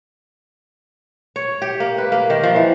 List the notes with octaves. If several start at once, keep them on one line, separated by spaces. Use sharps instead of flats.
C#5
G4
A#3
B4
A#3
D#3
F3
E3